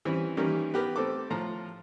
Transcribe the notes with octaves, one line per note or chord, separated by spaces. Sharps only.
E3 G3 C4 C#4 E4
D#3 E3 G3 A#3 C#4
B3 G4 A#4 B4
A3 C4 A4 D6
A2 F3 A#5